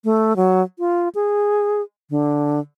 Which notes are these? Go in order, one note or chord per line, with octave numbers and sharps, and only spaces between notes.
A3
F#3
F4
G#4
D3